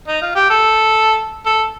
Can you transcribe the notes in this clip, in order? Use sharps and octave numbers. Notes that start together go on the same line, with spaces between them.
D#4
F4
G4
A4
A4